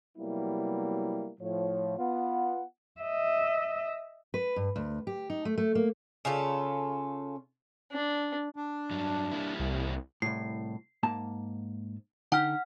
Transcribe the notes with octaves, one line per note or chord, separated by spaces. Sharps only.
C3 F#3 G3 A#3 B3 E4
A2 F3 C#5
B3 F4 F#5
D#5 E5
B4
G2
D2
G4
D#4
A3
A3
A#3
C#3 C#4 F4 A4
D4
D4
G2 F#3
G3 A#3 E4
C2
C2 A2 C7
G#2 A#3 A5
D3 D#4 F#5 G5 F6